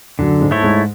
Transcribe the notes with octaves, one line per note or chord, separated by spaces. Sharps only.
F#2 D3 F#3
G#2 G#3
A3 E4 A4 C#5
G#2 G#3